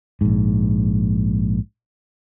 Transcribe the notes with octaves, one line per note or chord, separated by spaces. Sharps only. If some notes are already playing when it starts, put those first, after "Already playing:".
A#1 G#2